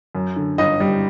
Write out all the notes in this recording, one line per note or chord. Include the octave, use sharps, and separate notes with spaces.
F#2
D3
G1 D#5
G3